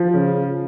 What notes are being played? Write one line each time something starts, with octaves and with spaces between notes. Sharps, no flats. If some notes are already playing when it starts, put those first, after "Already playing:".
Already playing: F3
C#3